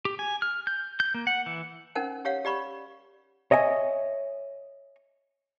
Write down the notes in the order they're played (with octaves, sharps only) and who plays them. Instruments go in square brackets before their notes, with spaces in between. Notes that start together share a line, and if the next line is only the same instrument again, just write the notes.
[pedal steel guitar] G4
G#5
F6
G6
G6
A#3
F#5
E3
[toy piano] C#4 D#4 A#4 C5 F#5
G4 C#5 F5 F#5
G4 D5 B5 C#6
[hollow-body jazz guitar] C#5 D#5 E5 F#5 G#5